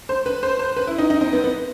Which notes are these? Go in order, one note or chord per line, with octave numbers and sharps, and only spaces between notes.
C5
B4
C5
C5
B4
E4
D#4
D#4
C4
B3
B3